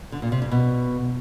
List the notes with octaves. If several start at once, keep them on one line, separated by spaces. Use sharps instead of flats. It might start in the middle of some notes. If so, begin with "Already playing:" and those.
D3
A#2
C3
G2
B2